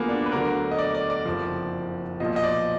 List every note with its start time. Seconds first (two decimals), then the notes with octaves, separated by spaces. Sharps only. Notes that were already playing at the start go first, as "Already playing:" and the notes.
Already playing: D2 D3 F#3 A#3 B3 F4 G#4
0.09 D4
0.26 B4
0.32 D2 D3 F#3 A#4
0.71 D#5
0.79 D5
0.95 D5
1.10 D5
1.26 F#1 F2 F3
2.20 B1 A#2 F3 D#5
2.36 D#5
2.44 D5